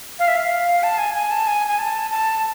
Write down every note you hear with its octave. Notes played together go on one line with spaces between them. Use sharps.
F5
E5
F5
A5
G#5
G#5
A5
G#5
G#5
A5
A5